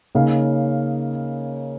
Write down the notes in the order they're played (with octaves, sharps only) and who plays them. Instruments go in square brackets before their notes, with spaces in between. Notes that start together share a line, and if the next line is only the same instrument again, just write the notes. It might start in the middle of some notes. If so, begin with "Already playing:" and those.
[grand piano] C#3 A#3 D#4 C#5 F5